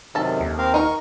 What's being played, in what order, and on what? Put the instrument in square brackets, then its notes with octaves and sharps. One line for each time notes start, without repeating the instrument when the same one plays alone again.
[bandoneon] F#2 C3 D#3 [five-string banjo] A4 A5
[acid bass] D#2
[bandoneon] C4 A#4 F5
[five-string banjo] D#4 A#4 [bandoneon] C#6